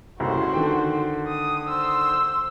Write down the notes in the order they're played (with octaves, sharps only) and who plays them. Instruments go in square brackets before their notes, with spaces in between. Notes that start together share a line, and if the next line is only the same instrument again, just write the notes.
[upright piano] F#1 C2 A2 [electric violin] F#4 C5
[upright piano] D3 D#3 G5
[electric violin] D#6
C5 E6